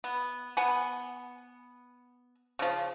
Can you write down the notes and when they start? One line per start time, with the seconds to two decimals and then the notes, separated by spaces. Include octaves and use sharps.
0.04 B3
0.57 B3 F#5 G#5
2.59 C#3 F3